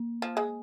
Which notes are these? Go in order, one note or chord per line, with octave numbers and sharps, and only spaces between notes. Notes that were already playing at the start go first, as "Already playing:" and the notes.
Already playing: A#3
F3
G#3